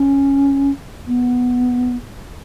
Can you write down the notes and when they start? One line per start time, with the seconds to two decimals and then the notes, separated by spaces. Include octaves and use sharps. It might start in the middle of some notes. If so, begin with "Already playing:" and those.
Already playing: C#4
1.07 B3